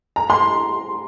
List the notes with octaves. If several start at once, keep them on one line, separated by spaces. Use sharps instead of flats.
A#5
C6